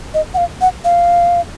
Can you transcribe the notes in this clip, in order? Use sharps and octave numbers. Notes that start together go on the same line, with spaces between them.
D#5
F#5
F5
F#5
F5